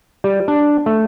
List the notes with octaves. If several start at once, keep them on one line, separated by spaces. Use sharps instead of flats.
G3
D4
A3